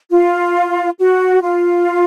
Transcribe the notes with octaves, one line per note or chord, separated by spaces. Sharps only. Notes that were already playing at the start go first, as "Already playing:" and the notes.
F4
F#4
F4